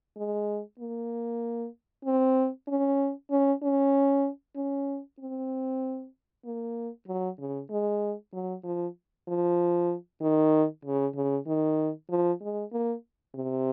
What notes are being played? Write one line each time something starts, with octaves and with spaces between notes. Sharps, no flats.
G#3
A#3
C4
C#4
C#4
C#4
C#4
C4
A#3
F#3
C#3
G#3
F#3
F3
F3
D#3
C#3
C#3
D#3
F3
G#3
A#3
C3